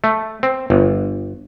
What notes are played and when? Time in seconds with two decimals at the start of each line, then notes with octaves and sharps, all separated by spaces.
0.04 A3
0.43 C4
0.70 G1